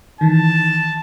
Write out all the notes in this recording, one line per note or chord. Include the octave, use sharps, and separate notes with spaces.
D#3 E3 A5